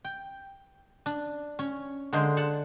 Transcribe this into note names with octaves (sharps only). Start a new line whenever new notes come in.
G5
D4
C#4
D3 G#3 A#3 G#4 C5
D4 F#5 A5